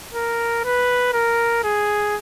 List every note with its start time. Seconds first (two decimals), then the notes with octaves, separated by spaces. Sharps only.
0.15 A#4
0.64 B4
1.13 A#4
1.64 G#4